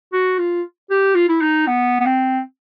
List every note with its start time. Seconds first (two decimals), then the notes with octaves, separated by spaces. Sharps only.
0.13 F#4
0.39 F4
0.90 G4
1.15 F4
1.29 E4
1.42 D#4
1.67 B3
2.00 B3
2.06 C4